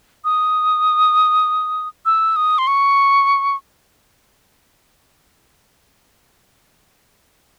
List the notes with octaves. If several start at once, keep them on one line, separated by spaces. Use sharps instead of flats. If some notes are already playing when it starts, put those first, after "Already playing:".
D#6
E6
D#6
C6
C#6